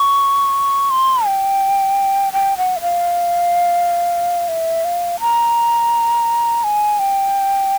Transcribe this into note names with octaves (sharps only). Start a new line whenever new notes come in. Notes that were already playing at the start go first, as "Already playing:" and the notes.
Already playing: C#6
C6
G5
G5
F#5
E5
F5
E5
F5
A#5
G#5
G5